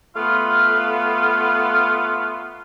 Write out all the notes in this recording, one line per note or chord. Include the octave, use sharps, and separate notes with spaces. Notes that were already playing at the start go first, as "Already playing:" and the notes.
A3 B3 F4 F5